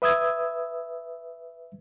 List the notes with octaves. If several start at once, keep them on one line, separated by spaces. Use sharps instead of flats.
B4 E5 D#6 E6 G#6